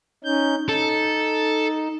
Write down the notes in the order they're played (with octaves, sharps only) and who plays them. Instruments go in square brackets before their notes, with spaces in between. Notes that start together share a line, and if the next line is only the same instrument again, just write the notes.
[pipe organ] C#4 D#4 G6
[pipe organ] D#4 [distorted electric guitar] A4